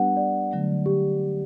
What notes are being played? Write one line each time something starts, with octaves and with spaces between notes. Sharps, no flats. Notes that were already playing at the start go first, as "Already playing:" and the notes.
Already playing: G3 B3 D4 G4 B4 F#5
D5
D3 F#3 A3
G4